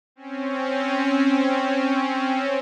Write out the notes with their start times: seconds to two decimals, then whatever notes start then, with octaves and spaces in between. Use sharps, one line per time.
0.16 C4 C#4